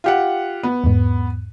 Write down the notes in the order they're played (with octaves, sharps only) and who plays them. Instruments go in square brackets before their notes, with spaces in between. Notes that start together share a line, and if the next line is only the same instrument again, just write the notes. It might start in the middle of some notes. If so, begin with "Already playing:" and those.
[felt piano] F4 G4 F#5
B3
[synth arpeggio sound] E2 G#2